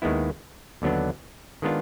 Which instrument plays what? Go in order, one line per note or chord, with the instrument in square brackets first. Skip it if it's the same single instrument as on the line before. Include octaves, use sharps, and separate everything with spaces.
[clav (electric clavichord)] D#2 D#3 G#3 B3 E4
D#2 D3 F#3 B3 D4
D#3 G#3 B3 D4 F4